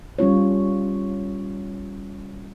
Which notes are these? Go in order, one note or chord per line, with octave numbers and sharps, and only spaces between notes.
G3 C#4 F4 C#5